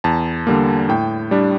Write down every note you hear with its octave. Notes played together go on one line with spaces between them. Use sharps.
E2 A5
D3 G3 A#3
A2 G5
G3 D4